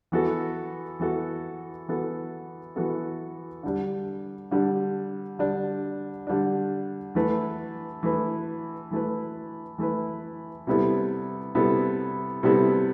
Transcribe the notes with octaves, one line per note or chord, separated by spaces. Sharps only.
E3 B3 F#4 A4
E3 B3 F#4 A4
E3 B3 F#4 A4
E3 B3 F#4 A4
D3 G3 D4
D3 G3 D4
D3 G3 D4
D3 G3 D4
E3 A3 E4 B4
E3 A3 E4 B4
E3 A3 E4 B4
E3 A3 E4 B4
C3 G3 B3 E4 A4
C3 G3 B3 E4 A4
C3 G3 B3 E4 A4